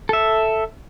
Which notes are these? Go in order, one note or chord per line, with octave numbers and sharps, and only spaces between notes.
A4 E5